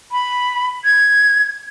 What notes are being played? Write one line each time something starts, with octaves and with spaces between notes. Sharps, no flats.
B5
G#6